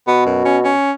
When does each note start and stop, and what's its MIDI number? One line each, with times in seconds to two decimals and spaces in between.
0.07 0.70 47
0.07 0.22 59
0.26 0.42 42
0.45 0.57 61
0.64 0.92 61